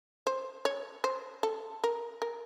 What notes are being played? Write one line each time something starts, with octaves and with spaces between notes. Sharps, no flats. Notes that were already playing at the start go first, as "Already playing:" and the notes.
C5
C#5
C5
A4
A#4
A#4